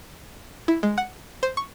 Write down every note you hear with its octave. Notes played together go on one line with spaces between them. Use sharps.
E4
G#3
F#5
C5
C#6